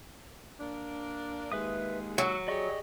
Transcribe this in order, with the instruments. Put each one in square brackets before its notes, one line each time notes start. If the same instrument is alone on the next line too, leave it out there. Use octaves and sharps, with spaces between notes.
[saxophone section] A#3 D4
[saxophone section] D#2 G#3 [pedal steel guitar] B4 E5 D#6
[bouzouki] F#3 [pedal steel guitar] F#4 C#6 E6
[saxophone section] G4 G#4 [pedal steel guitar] D5 D#5 C#6